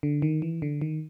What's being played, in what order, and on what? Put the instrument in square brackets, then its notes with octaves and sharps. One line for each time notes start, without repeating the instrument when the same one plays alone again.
[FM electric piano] D3
D#3
E3
D3
D#3